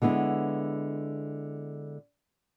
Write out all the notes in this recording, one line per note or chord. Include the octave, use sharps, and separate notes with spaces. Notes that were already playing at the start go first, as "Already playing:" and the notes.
D3 G#3 B3 E4